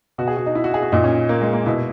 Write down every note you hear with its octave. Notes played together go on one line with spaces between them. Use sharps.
B2 F#4
G#4
F#4
D#4
E4
F#4
G#4
F#4
A#2 D#4
C#4
A#3
G#3
A#3
B2 E4